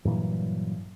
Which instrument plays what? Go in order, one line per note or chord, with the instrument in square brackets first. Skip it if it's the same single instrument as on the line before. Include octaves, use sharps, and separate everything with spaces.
[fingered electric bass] G2 A#2 E3 F#3